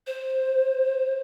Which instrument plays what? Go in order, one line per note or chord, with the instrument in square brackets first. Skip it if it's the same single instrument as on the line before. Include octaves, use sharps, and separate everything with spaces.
[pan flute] C5